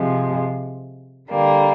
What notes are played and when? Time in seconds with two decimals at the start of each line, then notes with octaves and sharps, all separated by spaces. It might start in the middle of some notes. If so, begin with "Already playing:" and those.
Already playing: C3 F3 G#3
1.30 D3 G3 A#3